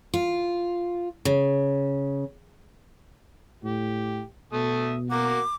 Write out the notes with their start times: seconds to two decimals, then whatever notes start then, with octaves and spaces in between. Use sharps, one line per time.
0.14 F4
1.25 C#3
3.63 A2 G4
4.53 B2 A3 E5 D#6
5.10 A#3 F#4 A#4 D6